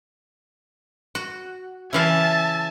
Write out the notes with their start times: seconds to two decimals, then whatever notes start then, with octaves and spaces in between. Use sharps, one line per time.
1.15 F#4
1.93 C#3 E3 E5 F5 G#5 A5